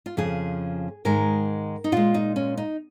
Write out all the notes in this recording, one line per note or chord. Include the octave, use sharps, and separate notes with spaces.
F4
F2 C#3 F3 G#4
G#2 D#3 G#3 A#4
D#4
A#2 G#3 F4
D#4
C#4
D#4